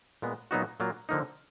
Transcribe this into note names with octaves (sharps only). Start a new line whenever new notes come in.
A#2 G#3 B3
A#2 F#3 B3 D#4 F#4
A#2 F#3 A#3 F4
D3 F3 A#3 D#4